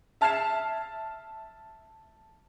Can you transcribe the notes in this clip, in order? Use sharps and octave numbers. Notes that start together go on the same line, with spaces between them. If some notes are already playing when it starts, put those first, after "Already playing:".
E5 A5 F6 G#6 C7 E7